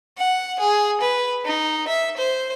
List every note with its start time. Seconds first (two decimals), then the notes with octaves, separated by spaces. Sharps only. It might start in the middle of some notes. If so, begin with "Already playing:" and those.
0.18 F#5
0.60 G#4
1.01 B4
1.45 D#4
1.88 E5
2.17 C5